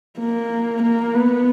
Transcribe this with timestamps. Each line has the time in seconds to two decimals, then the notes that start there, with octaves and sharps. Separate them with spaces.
0.20 A#3
0.82 A#3
1.15 B3